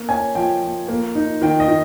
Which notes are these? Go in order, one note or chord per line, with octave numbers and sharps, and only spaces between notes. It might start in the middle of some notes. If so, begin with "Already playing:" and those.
Already playing: A#3
C#4 G#5
F3 G5
F3
A#3
D#4
D#3 G5
D#5
D#3